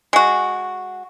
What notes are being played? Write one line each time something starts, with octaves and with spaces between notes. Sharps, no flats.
G#3 F#4